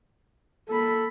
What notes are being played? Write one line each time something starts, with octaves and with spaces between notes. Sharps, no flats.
A#3 A4 B5